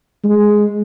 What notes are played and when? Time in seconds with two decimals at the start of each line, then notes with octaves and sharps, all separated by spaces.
0.24 G#3